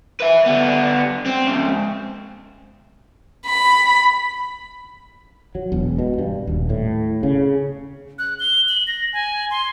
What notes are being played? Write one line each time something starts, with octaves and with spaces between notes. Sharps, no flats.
B4 E5
D3 B3
C4
G#2 C#3
B5
F#3
E1
B2
G2
D#1
A2
C#3
F#6
G7
F#7
A#6
G#5
C6